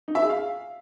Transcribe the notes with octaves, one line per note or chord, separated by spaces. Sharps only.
D#4
E5
G#4
F5